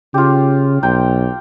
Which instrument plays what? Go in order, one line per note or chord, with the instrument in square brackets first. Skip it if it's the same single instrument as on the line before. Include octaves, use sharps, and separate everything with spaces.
[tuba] C#3 [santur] F4 G4
[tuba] B1 [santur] G5 A#5